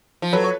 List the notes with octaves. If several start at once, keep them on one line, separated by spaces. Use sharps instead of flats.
F3
F#3 A4 B4
C#5